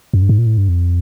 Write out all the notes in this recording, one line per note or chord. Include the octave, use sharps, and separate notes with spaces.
F#2
G2
G#2
A#2
A2
G2
F2